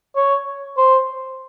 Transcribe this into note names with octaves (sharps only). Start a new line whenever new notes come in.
C#5
C5